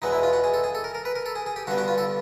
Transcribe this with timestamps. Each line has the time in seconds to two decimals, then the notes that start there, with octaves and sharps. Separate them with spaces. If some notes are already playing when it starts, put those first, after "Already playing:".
0.02 E2 B2 G#3 B3 D#4
0.12 E4
0.23 F4
0.33 F#4
0.44 G#4
0.54 A4
0.64 G#4
0.75 A4
0.84 A#4
0.95 A#4
1.05 B4
1.16 A#4
1.26 A4
1.35 G#4
1.46 G#4
1.56 G4
1.67 G2 D3 G3 B3 F#4
1.78 F#4
1.88 F4
1.98 A4